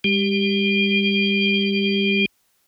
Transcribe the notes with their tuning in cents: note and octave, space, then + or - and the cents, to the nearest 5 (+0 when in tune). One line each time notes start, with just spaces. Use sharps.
G3 +45 G4 +0